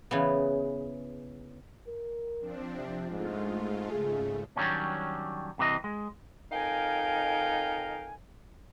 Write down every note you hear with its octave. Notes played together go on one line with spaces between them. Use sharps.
C#3 E3 B3
A#4
F3 C4 D4
C3
G#2 G#3 A3 F4
G#2 C#3 A3 G#4
D#3 F#3 G3 A3 C#4 D4
C2 C3 E3 D#5
G#3
F2 D#4 A#4 F5 G5 G#5